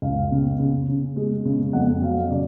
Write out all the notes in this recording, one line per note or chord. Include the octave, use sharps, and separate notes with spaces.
C#2 F5
C#3
C#3
C#3
G#3
C#3
F2 F#5
F#3 F5
C#3 D5